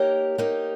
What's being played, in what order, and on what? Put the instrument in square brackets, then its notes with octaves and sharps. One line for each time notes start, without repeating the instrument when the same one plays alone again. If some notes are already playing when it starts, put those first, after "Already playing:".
Already playing: [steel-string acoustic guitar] A#3 D#4 G4 A#4 [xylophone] C#5
[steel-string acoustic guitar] A#3 D#4 G4 A#4